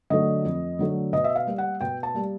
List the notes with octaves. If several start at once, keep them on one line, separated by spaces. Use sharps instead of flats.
D3 F#3 A3 D#5
F2
D3 F#3 A3
B2 D#5
E5
F5
G3 A#3
F#5
B2 G5
A5
G3 A#3